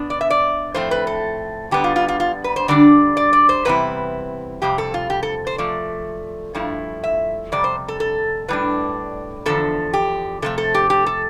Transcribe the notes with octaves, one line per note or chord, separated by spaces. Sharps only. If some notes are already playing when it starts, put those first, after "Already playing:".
Already playing: B2 B3 D4
D5
E5
D5
A2 F3 A3 C4 C5
B4
A4
D3 G3 B3 G4
F4
F4
F4
F4
B4
C5
D3 G3 D4 D5
D5
D5
C5
E2 C3 G3 C4 E4 B4
F2 C3 G3 C4 G4
A4
F4
G4
A4
C5
C3 F3 A3 D5
G2 F3 A3 E4
E5
F2 C3 G3 D5
C5
A4
A4
A2 G3 D4 B4
E2 D3 F3 A4
G4
C3 F3 A3 A4
A4
G4
G4
A4